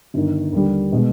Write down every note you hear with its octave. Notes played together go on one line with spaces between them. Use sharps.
G1 G2 D#3
D#2 D3 G3
B2 G#3